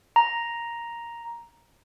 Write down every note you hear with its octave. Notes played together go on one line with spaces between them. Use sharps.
A#5